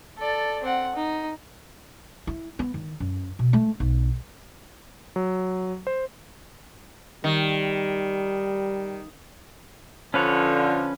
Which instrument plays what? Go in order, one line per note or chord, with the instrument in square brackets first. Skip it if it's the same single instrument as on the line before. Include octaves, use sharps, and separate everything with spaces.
[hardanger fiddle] A4 D5
C4 F#5
D#4
[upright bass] E4
B3
D#3
F#2
B2
A3
B1
[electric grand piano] F#3
C5
[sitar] D#3 [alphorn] G3
[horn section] D3 F3 [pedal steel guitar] C#4 B4 C#5